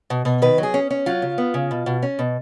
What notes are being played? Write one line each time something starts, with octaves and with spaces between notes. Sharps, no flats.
B2
B2
D#3 B4
F#3
G#4
C#4
C#4
F#3 F4
C#3
B3
C#3
B2
B2
C#4
B2